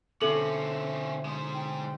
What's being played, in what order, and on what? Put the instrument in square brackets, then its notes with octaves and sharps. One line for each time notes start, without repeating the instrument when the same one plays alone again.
[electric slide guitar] B2 D3 [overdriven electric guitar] C4 C#4 [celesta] A4 F#7 [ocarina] E5
[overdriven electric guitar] G#3 C5
[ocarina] G5